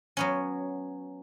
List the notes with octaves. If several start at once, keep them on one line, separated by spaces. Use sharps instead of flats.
F#3 B3 C#4